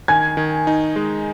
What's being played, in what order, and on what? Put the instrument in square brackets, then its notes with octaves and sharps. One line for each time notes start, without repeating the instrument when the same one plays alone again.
[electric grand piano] D#3 [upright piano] G#5 G#6
[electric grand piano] D#3
D#4
G#3